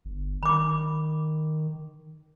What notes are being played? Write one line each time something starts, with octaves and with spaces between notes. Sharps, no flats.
G1
D#3 B5 D6